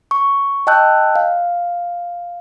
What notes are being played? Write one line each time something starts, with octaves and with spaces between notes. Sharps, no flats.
C#6
D#5 G5 A5 E6 F#6 G6
F5